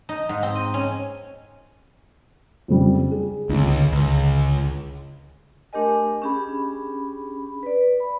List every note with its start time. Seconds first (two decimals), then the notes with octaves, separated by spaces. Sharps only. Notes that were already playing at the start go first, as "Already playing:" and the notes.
0.09 D#4
0.29 G#2
0.43 C4
0.55 D#5
0.74 C#4
2.68 F2 C#3 G3
3.11 G#4
3.49 C#2 G2 D3
3.92 C#2
5.73 A3 D4 G4 A#4 D#5 G#5
6.22 C#4 D4 G4 G#4 B5
7.63 B4 D5
8.00 B5